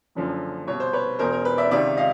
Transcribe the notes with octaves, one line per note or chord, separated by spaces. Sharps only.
F#1 F#2 D3 F3
C2 B2 C#5
C5
B4 C#5
E1 E2 B2 A#4 C5
A#4
B4
D5 E5
C#2 C3 D#3 D5 E5
D#5 F5